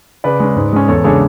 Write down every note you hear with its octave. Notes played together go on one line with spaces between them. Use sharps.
C#3 B4 D5
G#3 C#4
G#2
G#3 C#4
E2 A4 C#5
C#3 G#3 D4 A4 C#5